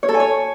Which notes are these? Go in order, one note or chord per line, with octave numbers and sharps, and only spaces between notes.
C#5
A4
G#5
C#5